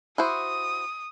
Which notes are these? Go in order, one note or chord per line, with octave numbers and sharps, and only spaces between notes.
E4 F#4 C5 D#6